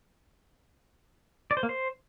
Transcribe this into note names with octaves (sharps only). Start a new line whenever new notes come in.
D5
C5
A#3
C5